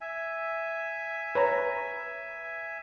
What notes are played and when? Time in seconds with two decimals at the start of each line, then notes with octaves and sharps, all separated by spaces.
0.01 E5 G#5
1.35 B4 C#5 A#5